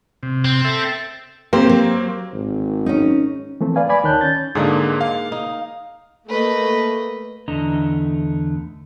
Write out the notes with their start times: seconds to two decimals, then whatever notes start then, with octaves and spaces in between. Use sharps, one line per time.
0.23 C3
0.45 C4
0.65 A4 E5
1.53 A#3 C4 G4 C5
1.69 F#3
2.33 G#1
2.86 C#4 D#4
3.61 E3 F3 A3 C4
3.76 B4 D5 F5 G#5
3.89 D5 G#5 B5 D6
4.03 D2 D#3 C#5 A5 F#6 G6
4.21 C#4 G6 A6
4.55 G#2 D3 A#3 D#4 G#4
5.01 F5
5.32 D#4
6.29 A3 A#3 B4 D#5
7.48 E2 D3 A3 D4 D#5 A#5